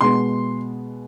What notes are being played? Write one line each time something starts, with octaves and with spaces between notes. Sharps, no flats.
B2 G#3 B3 C6